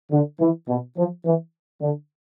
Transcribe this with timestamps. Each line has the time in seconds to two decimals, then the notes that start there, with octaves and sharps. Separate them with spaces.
0.12 D3
0.40 E3
0.68 B2
0.97 F3
1.25 E3
1.81 D3